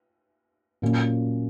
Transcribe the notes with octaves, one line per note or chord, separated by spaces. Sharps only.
A#2 F#3 A#3 C#4